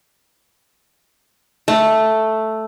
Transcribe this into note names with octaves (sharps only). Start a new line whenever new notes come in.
A3